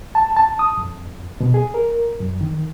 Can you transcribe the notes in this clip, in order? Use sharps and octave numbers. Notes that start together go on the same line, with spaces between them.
A5
A5
D#6
F2
B2
G#4
A#4
F#2
D#3